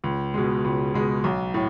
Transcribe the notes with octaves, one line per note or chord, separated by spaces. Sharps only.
C#2
B2 G#3
C#2
B2 G#3
B1
A2